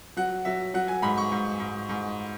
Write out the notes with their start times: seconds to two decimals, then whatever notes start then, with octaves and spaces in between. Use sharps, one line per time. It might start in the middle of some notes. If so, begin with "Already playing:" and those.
0.17 F#3 F#5
0.45 F#3 E5
0.74 F#3 F#5
0.88 G#5
1.02 G#2 B5
1.17 C#6
1.32 G#2
1.60 G#2
1.89 G#2